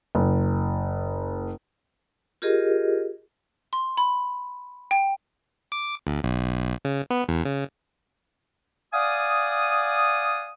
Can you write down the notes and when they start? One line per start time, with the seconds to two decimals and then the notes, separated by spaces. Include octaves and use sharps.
0.15 F#1
2.42 F4 G4 G#4 A#4 D#5
3.73 C6
3.97 B5
4.91 G5
5.72 D6
6.07 D2
6.24 B1
6.85 C#3
7.10 B3
7.29 E2
7.45 C#3
8.94 D5 F5 F#5 G#5 D#6